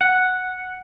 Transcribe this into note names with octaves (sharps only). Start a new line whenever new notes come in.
F#5